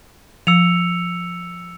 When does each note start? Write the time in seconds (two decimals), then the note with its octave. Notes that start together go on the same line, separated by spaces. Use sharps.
0.47 F3 E6 C#7 F7